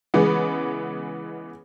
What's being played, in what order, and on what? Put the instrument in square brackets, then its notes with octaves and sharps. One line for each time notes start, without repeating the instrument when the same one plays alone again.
[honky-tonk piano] C#3 E3 G#3 B3